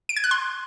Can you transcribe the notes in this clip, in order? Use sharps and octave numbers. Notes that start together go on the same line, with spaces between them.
D7
G#6
F#6
C6